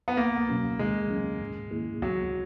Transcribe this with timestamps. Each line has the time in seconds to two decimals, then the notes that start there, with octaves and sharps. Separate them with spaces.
0.08 B3
0.17 C#2 A#3
0.49 B2 F#3 C#4 F#4
0.79 D#3 G#3
1.10 F#3 C#4
1.40 G#2
1.71 D#3 A#3 E4 G#4
2.02 C#2 F#3